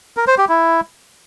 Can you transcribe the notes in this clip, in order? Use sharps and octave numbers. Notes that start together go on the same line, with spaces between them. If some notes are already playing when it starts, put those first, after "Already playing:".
A#4
C5
G4
E4